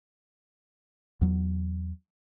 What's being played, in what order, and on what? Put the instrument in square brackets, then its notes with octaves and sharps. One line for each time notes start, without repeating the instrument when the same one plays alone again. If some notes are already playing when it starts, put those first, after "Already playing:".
[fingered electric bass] E2 F#3